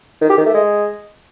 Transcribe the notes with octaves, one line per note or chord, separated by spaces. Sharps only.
D#3
G4
D#3
A3
G#3